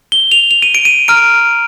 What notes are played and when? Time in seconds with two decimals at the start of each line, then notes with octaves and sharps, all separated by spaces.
0.12 G7
0.32 F7
0.51 F7
0.62 D#7
0.75 D7
0.85 D#7
1.08 A#5 F6 D7